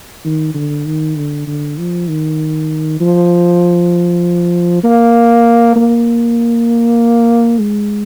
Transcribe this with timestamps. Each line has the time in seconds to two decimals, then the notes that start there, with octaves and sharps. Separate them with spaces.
0.25 D#3
0.54 D3
0.85 D#3
1.16 D3
1.47 D3
1.78 F3
2.08 D#3
3.00 F3
4.83 A#3
5.76 A#3
7.59 G#3